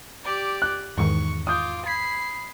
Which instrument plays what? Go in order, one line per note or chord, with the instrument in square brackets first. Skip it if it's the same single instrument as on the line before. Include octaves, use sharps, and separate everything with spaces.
[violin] G4 D5
[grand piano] F#6
[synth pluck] E2 G#2 D#3 [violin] C#6
[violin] F4 D6 [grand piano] D#6 G6
[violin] B5 C7 [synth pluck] G#6 B6